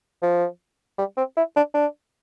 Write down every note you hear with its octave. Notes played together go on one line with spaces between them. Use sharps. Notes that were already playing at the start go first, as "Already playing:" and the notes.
F3
G3
C4
E4
D4
D4